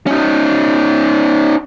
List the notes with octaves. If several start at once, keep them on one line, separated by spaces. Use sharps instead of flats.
C#4 D#4